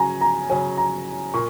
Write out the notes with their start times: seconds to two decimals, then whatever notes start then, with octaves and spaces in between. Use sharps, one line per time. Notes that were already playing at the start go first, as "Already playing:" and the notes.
Already playing: C#3 F#3 C#4 G#5 A#5
0.21 A#5
0.50 C#3 F#3 C#4 G#5
0.77 A#5
1.34 A#2 C#6